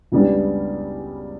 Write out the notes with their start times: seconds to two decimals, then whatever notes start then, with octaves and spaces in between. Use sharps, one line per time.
0.12 C#2 C#3 G3 B3 D4